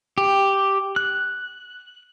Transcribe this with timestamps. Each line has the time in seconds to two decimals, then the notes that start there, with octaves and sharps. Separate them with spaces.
0.18 G4
0.96 F#6